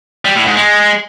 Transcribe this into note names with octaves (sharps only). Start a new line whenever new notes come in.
G3
A2
G#2
G#3